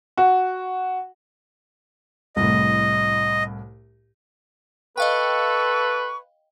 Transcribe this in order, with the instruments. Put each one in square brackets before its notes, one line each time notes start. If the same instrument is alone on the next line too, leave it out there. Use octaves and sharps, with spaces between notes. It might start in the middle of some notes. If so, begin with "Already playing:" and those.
[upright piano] F#4
[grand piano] C2 A2 [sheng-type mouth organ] D#5
[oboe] A4 [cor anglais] B4 [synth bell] D#5 F5 G5 [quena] C#6